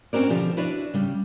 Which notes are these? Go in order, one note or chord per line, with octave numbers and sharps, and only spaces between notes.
C4 C#4 F#4 A#4 C5 D5
B2 D3 F3 G4
D4 E4 F#4 B4 C#5 D5
C#3 G3